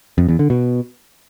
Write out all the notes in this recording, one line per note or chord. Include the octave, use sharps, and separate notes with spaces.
F2
E2
D3
B2